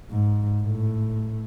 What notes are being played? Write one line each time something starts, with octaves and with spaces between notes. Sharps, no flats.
G#2
A2